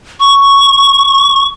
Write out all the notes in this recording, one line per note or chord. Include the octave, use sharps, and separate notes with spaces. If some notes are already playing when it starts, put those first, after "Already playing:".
C#6